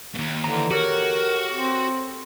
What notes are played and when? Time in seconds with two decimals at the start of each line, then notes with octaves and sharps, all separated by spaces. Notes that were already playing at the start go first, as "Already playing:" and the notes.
0.14 D#2 G#2
0.44 D3 E3 A#5
0.71 F#4 G4 A4 A#4 C#5
1.52 C4